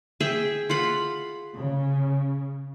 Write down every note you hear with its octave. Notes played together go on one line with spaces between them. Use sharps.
G#4 E5 G5
F4 F#5 B5
C#3